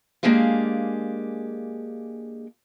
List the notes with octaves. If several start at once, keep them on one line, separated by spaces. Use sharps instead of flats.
G#3 A#3 D4 G4 G#4 F5